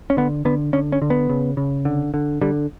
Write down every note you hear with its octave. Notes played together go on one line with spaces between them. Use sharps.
C#4
D3 B3
D3 B3
D3 C#4
C#4
D3
B3
C#3
C#3
D3
D3
D3 G3